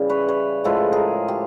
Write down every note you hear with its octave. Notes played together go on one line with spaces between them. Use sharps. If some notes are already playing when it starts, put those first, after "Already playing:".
Already playing: C#3 E3 G3
B4 C#5
B4 C#5
A2 F3 G#3 A4 B4
G#4 A#4
G4